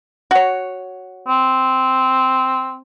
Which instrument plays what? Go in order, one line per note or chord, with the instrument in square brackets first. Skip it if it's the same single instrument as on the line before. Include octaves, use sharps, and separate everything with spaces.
[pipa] F#4 C#5
[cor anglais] C4